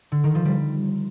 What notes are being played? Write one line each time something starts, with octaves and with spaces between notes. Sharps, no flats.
D3
D#3
F3
G3